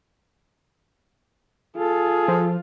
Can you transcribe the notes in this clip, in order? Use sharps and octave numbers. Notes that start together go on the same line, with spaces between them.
F4 G#4 A4
F3